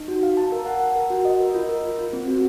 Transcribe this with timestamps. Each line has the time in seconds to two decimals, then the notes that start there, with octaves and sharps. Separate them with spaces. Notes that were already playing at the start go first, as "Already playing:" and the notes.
Already playing: D#4
0.08 F#4
0.23 F5
0.37 A5
0.52 A#4
0.66 F#5
0.80 F#5
0.96 A#4
1.10 F#4
1.25 D#5
1.40 A#4
1.54 F4
1.69 A#4
1.84 F4
1.99 F4
2.13 C4
2.28 F#4